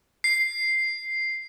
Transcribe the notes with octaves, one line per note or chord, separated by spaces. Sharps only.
C7